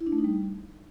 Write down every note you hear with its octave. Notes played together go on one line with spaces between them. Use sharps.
E4
D4
A3
D#4
G3